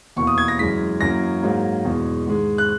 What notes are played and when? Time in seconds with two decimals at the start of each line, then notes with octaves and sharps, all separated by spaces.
0.16 E2 B2 A#3 C#6
0.27 D#6
0.38 G#6
0.48 A#6
0.58 F#2 E3 G#3 B6
1.01 F#2 E3 A#3 A#6
1.43 G#2 F#3 A#3
1.85 E2 B2 G#3
2.27 G#2 D#3 G#3
2.58 F#6